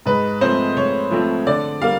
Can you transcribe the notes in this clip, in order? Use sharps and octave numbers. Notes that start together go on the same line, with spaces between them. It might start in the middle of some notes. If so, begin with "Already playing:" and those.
G#2 B4
F3 A3 C4 C5
G#2 C#5
F3 A3 C4
D3 D5
G3 A#3 F5